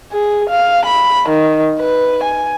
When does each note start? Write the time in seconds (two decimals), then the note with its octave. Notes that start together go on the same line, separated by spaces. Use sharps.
0.12 G#4
0.50 F5
0.86 B5
1.30 D#3
1.80 B4
2.24 G#5